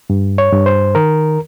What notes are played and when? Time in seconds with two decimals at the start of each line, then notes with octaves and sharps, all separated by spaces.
0.10 G2
0.38 C#5
0.53 G2
0.66 C5
0.95 D#3 A#4